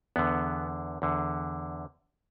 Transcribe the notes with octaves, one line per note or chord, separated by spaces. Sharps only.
E2 D3 B3
E2 D3